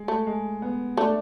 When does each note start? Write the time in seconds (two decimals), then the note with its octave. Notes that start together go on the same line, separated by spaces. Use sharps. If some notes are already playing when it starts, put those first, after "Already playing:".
Already playing: G#3
0.08 A3
0.27 G#3
0.62 B3
0.97 A3 D4